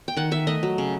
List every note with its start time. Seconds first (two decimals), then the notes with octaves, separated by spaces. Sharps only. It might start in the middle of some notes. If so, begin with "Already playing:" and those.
0.08 G5
0.16 D#3 F#5
0.31 D#3 E5
0.47 A3 D#5
0.63 F#3
0.78 C#3